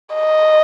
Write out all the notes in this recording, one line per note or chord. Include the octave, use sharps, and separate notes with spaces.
D#5